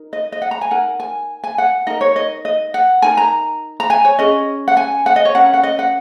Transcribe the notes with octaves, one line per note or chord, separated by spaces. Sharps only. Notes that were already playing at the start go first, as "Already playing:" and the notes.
Already playing: D#4 A#4
D#5
D#5
F#5
A#5
G#5
D#4 A#4 F#5
G#5
G#5
F#5
D#4 A#4 D#5
C#5
D#5
D#5
F#5
D#4 A#4 G#5
A#5
A#5
G#5
C#5
C#4 G#4 D#5
F#5
G#5
F#5
D#5
C#5
C#4 A#4 F#5
F#5
D#5
F#5